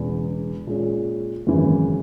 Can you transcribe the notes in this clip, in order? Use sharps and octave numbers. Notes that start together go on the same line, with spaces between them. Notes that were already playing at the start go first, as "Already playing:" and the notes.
Already playing: E1 E2 C#3
A#2 G#3 C#4
G#1 F#2 C#3 E3